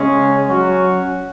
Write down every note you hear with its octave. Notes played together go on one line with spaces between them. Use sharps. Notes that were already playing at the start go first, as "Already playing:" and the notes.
Already playing: C#3 G#3 C#4
F#3 C#4 F#4